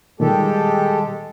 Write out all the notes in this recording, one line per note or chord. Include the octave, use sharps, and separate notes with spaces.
A#2 D#3 G3 G#3 G4 A4